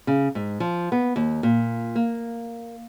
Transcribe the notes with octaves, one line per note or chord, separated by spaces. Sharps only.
C#3
G#2
F3
B3
D#2
A#2
A#3